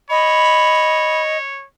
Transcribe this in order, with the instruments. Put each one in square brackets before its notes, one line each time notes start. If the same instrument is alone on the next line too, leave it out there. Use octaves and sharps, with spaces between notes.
[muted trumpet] C#5 [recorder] D#5 [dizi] B5